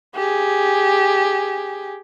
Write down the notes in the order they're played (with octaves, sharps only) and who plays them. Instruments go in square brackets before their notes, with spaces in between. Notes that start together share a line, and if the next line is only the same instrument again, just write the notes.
[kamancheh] G4 G#4